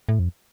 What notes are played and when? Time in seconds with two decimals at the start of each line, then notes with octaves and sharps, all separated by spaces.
0.09 A2
0.19 F2